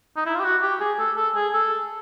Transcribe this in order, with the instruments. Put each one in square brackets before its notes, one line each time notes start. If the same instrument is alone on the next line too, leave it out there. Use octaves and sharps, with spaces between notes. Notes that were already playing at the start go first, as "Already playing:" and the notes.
[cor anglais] D#4
E4
F4
G4
F#4
G4
G#4
A4
A4
G#4
A4